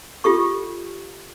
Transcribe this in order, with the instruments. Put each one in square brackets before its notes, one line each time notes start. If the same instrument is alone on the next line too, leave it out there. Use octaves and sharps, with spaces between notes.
[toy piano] F4 G4 A4 C#6